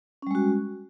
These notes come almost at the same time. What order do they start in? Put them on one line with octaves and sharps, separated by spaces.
C#4 G3 G#3 F#4